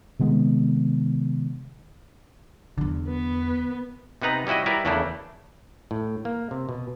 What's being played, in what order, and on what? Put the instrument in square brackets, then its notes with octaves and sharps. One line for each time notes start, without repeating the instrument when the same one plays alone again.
[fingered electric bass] C3 D#3 G#3 B3
[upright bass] E2 F#3 [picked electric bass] D3
[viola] B3
[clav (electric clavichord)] C3 B3 D#4 B4 A#5
G3 C#4 E4 F#4 D#5
G3 E4 A#4 B4 D5
E2 C#3 A3 A#3 D4 E4
A2
A#3
C3
B2